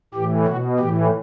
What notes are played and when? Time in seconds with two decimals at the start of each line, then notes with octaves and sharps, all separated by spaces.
0.14 A2 E3 G4
0.47 B2 F#4
0.79 A2 E3 G4